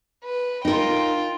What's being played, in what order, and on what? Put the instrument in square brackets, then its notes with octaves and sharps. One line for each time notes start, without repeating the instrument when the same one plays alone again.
[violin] B4
[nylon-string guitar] D#4 A#4 [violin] F4 G5